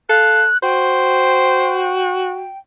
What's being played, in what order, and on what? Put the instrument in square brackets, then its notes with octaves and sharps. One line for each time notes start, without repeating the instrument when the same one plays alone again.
[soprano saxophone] A4 [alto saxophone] F5 [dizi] F#6
[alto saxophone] F#4 [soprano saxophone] C5 [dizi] G5